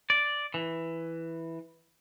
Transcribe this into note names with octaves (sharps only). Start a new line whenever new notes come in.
D5
E3